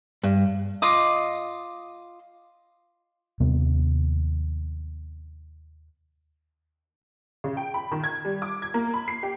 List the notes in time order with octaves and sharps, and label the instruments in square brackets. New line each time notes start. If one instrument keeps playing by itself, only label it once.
[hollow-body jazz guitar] G2
[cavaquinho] F4 D#5 D6 D#6
[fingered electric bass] D#2 C3 B3
[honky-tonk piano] C#3
G5
B5
D#3
G#6
G3
D6
G#6
A#3
B5
C7
G4